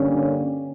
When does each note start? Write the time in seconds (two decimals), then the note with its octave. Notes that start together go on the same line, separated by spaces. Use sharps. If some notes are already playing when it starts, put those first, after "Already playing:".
Already playing: G2 D3 G3 A#3 C#4